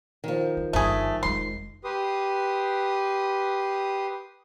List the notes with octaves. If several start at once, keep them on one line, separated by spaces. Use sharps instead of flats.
D#3 F3
D#4
G1 G2 A3 G#4
F1 G#3 C6
G4 B4 C6 D#6